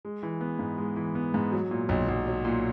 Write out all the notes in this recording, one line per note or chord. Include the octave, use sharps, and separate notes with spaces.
G#3
E3
B3
G#2
G#3
E3
B3
G#2
F#3
A#2
B1
B1
F#3
A#2